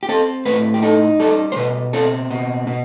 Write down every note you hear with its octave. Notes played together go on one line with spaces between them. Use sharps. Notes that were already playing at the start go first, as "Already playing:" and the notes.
G4
C4 A4
A2 B4
G4
D#4 A4
G3 A4
C5
B2 B4
C4 A4
B2
B2